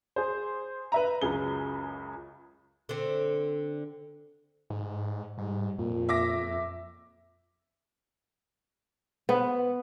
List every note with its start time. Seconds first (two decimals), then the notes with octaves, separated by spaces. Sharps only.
0.16 G#4 C5
0.92 B4 E5 A#5
1.22 C#2 F#2 C#3 G#4 G7
2.89 D3 C4
4.70 G#2
5.38 G#2 G3
5.78 F2 A#2
6.09 E5 D6 A#6
9.29 B3 B4 C5 F#5